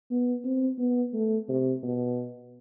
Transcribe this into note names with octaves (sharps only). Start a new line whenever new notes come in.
B3
C4
B3
A3
C3
B2